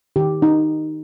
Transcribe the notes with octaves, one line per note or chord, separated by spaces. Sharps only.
D#3 G4
D#4